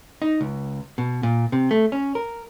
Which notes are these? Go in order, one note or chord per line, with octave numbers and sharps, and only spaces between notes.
D#4
C#2
B2
A#2
C3
A3
C#4
A#4